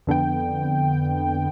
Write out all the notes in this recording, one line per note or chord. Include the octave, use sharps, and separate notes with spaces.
F2 D3 B3 G5